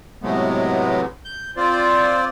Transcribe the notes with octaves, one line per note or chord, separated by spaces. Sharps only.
A2 C3 F#3 G#3 A3 B3
G6
C4 F4 C5 D5